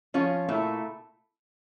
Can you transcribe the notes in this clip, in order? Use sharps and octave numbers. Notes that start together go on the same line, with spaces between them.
F3 C#4 F4 C#5
A#2 A3 E4